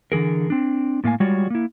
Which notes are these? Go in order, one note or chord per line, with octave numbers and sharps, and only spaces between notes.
D3 E3 G#4 A#4
C4 D4
A2 A#3 F5 G#5
G3 G#3 F4 F#4 C#5 D5
A#3 E4